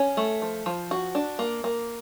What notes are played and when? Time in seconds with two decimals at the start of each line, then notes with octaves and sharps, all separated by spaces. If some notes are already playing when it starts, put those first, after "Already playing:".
Already playing: C#4
0.17 A3
0.42 F3
0.66 F3
0.91 F#4
1.15 D4
1.39 A#3
1.64 A#3